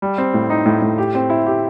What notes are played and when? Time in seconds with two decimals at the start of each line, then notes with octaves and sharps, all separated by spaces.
0.02 G3
0.18 C4
0.34 A2
0.50 D#4
0.66 A2
0.82 A2
0.98 G4
1.15 C4
1.30 E4
1.46 G4